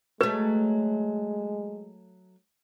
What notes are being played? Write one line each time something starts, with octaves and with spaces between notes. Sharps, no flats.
F#3 G#3 A3 B4